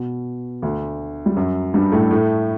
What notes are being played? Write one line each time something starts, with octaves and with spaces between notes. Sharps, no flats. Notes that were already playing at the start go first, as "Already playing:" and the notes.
Already playing: B2
D2 D3
G3
F#2 F#3
G2 G3
A2 A3
A2 A3